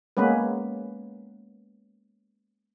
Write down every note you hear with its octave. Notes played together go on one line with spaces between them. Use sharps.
G#3 A#3 B3 C#4 B4